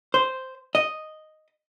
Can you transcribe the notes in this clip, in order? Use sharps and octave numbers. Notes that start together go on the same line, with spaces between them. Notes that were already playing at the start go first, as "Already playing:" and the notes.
C5
D#5